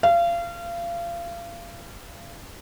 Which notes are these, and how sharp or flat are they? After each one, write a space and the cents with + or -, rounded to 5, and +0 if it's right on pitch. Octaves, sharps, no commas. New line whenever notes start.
F5 -30